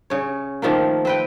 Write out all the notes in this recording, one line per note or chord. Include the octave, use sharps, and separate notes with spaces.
C#3 C#5
D#3 F3 A3 A#3
C4 B4 G5